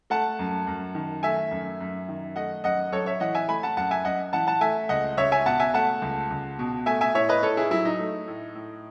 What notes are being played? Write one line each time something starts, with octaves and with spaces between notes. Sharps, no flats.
A3 F#5 A5
F#2
F#2
D#3
A3 E5 G#5
F#2
F#2
D#3
A3 D#5 F#5
F#2 D#5 F#5
F#2 A4 C#5
C#5 E5
E3 D#5 F#5
E5 G#5
A3 G#5 B5
F#5 A5
F#2 F#5 A5
E5 G#5
F#2 D#5 F#5
E3 F#5 A5
F#5 A5
A3 E5 G#5
C#2 D#5 F#5
C#2 C#5 E5
E5 G#5
B2 F#5 A5
E5 G#5
A3 F#5 A5
C#2
C#2
B2
A3 E5 G#5
E5 G#5
A2 C#5 E5
B4 D#5
A2 A4 C#5
E4 G#4
F#3 E4
D#4
A3
A2
A2